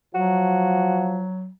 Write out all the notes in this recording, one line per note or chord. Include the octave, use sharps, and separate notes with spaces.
F3 F#3 F#4